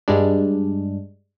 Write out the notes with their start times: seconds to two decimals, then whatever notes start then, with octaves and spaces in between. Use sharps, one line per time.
0.08 G2 G3 G#3 D4